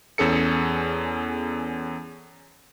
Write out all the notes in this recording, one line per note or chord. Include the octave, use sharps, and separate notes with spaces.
E2 C#4 G#4 A4 C#7